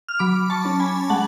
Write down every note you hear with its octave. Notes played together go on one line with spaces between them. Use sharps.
F6
F#3 B5 D6
A5 C#6
C#4
G#5 B5
G#3 F#5 A5